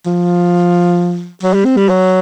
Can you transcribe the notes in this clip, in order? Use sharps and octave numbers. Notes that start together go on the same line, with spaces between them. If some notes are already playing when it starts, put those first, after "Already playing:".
F3
F#3
G3
C4
G3
F#3